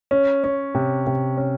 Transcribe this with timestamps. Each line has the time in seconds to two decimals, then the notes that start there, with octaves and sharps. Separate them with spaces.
0.11 C#4
0.44 C#4
0.75 C3
1.07 C3
1.37 C#4